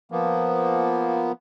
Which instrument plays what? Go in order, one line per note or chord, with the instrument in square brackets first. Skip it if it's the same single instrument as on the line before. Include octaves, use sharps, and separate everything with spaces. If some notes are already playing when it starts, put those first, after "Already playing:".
[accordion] F3 A#3 B3